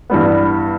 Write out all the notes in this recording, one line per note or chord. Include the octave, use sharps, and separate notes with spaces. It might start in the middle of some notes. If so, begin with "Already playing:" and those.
G2 E3 G3 B3